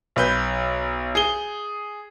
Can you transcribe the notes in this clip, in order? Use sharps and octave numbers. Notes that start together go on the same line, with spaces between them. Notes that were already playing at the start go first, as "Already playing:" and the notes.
B1 B4 G6
G#4 G7